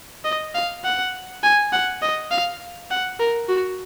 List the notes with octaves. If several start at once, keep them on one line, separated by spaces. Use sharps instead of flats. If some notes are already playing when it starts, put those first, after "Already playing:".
D#5
F5
F#5
G#5
F#5
D#5
F5
F#5
A#4
F#4